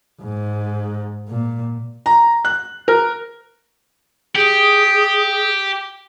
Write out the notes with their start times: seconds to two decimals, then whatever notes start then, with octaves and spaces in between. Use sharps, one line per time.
0.22 G#2
1.28 A#2
2.06 A#5
2.45 F#6
2.88 A#4
4.36 G4 G#4